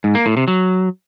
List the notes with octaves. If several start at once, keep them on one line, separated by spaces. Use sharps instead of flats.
G#2
A#3
A2
C3
F#3